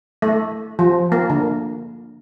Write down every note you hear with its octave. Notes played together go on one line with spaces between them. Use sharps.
A3
F3
A#3
D3